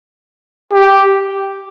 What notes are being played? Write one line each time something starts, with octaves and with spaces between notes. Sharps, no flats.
G4